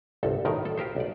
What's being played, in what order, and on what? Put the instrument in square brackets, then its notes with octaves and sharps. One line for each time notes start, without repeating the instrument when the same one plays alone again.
[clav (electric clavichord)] G1 C2 A4
B1 A2 D#3 A#4
A4
F4 G4 A#4 C5
B1 D5